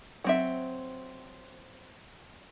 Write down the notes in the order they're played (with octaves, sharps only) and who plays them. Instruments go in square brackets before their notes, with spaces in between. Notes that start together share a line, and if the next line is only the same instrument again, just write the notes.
[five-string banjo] F#3 C4 E5